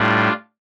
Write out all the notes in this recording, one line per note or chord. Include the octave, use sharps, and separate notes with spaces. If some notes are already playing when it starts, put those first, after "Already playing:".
Already playing: A2 G3 D4 F4